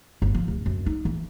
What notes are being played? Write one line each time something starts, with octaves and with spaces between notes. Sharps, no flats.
G1
F3
D1
F#2
D#4
E3